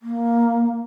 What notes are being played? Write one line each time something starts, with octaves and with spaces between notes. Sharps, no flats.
A#3